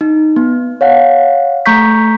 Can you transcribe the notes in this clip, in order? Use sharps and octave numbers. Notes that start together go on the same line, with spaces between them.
D#4
B3
C#5 F5 F#5
A3 A#5 C#6 G6 B6